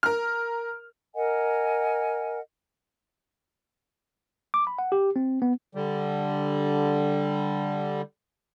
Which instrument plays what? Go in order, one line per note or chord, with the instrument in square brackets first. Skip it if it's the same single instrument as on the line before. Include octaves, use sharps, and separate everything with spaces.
[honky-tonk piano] A#4 F6
[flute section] A#4 D#5 F#5 G#5
[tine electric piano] D6
B5
F#5
G4
C4
B3
[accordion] D3 G3